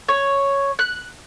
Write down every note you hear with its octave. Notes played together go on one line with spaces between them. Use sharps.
C#5
F#6